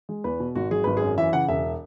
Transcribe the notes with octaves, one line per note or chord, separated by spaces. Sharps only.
G#3
E2 B4
B2
G#1 F#4
F#3 G#4
G#1 B4
F#2 G#4
E3 E5
C#3 F#5
E1 E5